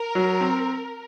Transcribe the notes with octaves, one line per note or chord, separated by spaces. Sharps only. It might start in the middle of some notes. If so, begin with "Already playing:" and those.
Already playing: A#4
F#3
C4